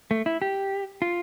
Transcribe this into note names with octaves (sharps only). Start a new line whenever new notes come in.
A3
E4
G4
F4